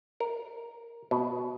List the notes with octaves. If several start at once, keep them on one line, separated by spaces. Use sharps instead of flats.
A#4
B2